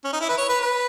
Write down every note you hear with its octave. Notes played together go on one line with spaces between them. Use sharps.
C#4
D#4
E4
B4
C#5
B4
B4